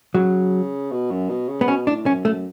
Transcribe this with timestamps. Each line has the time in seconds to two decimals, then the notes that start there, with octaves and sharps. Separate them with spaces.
0.14 C#3 F#3
0.92 B2
1.11 F#2
1.29 B2
1.48 C#3
1.61 B3
1.68 B2 C#4
1.87 A2 D4
2.06 F#2 C#4
2.25 F#2 A3